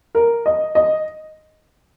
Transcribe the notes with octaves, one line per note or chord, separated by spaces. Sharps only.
A#4
D#5
D#5